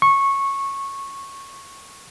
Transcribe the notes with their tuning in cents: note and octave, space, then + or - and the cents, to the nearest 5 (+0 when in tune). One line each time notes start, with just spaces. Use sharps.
C#6 -15